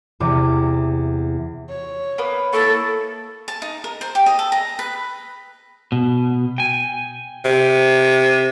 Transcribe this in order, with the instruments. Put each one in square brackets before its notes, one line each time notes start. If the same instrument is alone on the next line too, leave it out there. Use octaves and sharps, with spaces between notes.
[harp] E2 C3 D5 D6
[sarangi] C#5
[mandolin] A#3 B3 B4
[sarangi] A#3 [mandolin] E4 C#6 [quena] A4
[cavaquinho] A5
D#4
A#4
C5
G4
D#5
A4
A#5
B4
[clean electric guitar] B2
G5 G#5
[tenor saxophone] C3